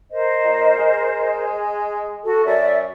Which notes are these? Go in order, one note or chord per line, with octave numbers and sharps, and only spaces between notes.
A#4 C5 D#5
A#2
G#3
F#4 A4
F#2 D5 E5 F#5